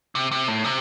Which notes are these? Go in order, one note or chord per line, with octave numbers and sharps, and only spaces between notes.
C3
C3
A2
C3